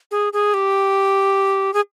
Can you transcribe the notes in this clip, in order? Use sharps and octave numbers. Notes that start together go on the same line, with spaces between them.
G#4
G#4
G4
G#4